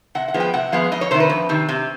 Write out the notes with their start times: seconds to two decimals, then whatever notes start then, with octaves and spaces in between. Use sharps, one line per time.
0.15 C3 F#5
0.28 F#5
0.34 F3 G#3 B3
0.40 G5
0.54 C3 F#5
0.72 F3 G#3 B3 F5
0.92 F2 D#5
1.01 C#5
1.11 C3 D#3 C5
1.20 B4
1.29 F2
1.49 C3 D#3
1.69 C3